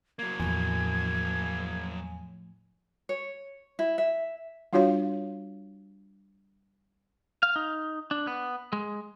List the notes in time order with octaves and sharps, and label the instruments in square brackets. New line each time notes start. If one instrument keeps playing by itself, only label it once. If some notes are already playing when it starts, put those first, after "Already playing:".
[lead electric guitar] F#3 A#3 [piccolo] G#6
[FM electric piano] E2 G#5 [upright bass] A2 F3
[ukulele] C#5
E4
E5
[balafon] G3 D4 F4 F#4 C#5 F5
[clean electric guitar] F5
D#4
D4
B3
G#3